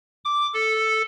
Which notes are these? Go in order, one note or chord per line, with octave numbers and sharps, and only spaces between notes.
D6
A4